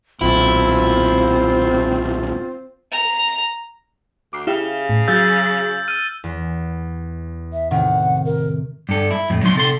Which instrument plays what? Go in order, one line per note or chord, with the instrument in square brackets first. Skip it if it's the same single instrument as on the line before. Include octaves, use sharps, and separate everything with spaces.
[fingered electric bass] D#1 B1 [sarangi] C4 [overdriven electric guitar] E4 [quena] F4
[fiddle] A#5
[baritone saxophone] D2 [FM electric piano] D6 C7
[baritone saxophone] C#3 [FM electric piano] E4 G4 F5
[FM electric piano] A2
[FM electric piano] F#3 G#4 F5 [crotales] E6 G6 A6
[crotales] F6 D#7
[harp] E2
[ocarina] E5
[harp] A2 C3 D#3 [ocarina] F#5
[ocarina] A#4
[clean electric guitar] G2 A4
E4
F2 A2
F#3 D#4 C6
C3 A4 C6